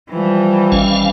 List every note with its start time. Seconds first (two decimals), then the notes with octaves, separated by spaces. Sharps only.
0.11 E3 F3 G3
0.72 G#1 C#4 F5